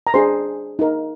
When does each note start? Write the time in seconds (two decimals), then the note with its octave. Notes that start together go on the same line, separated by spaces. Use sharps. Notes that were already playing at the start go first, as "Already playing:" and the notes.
0.07 A#5
0.14 D4 G#4 C5 C6
0.79 D#4 A#4